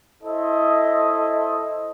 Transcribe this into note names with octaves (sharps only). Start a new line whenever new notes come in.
E4 A4 C5 D#5